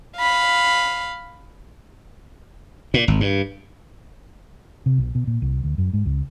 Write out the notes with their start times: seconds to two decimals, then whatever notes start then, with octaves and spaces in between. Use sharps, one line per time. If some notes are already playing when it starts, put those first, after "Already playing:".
0.17 F5 B5
2.94 A#2
3.08 G#1
3.20 G2
4.86 C3
4.98 B1
5.15 B2
5.27 A#2
5.42 C2
5.64 D2
5.78 F#2
5.93 G#2
6.06 C#2